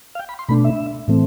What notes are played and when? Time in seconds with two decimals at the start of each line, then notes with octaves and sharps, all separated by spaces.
0.15 F5
0.19 G5
0.29 B5
0.39 C6
0.49 B2 A3 D4 B5
0.64 E5
1.08 A2 E3 A3 C4